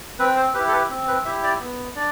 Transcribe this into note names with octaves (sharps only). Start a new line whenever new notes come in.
C4 B4
C5
E4 G4 B4
A4
B4
C4
B4
E4 G4 E5
D5
B3
D4 D5